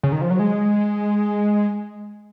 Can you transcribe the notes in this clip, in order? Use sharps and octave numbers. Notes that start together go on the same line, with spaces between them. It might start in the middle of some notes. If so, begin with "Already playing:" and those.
C#3
D#3
F3
F#3
G#3